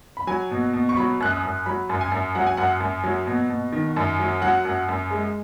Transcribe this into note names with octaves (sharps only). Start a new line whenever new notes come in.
B5
F#3 G#5
B2
B2
C#6
F#3 B5
F#2 F#6
D#6
F#2
F#3 B5
F#2
G#5
F#2
F#3 F#5
G#5
F#2 F#5
F#2
F#3
B2
B2
D#3
F#2
F#3
F#3 F#5
F#2
F#2
G#3